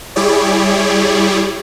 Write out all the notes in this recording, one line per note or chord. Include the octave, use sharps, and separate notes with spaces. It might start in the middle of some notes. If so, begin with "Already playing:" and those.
G3 E4 G4 G#4 C#5 D5